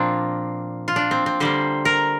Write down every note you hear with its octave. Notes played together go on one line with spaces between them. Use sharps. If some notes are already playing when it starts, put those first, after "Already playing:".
Already playing: A#2 F3 A#3 C4 D4 F4
F4
D4
C4
C4
D3 G3 A#3 C5
A#4